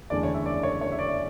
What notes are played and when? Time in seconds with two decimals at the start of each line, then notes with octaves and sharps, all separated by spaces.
0.10 F#1 E2 D3 A3 D5
0.23 C#5
0.34 E5
0.46 D5
0.63 C#5
0.81 C#5
0.92 E5
0.99 D5